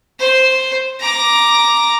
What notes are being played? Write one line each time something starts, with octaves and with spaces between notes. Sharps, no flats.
C5
A#5 D6